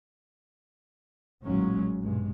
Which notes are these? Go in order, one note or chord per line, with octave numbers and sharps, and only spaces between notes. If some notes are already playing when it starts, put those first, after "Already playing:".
A1 D#2 A#2 F#3 G#3 C#4
A#1 G2 B2 G#3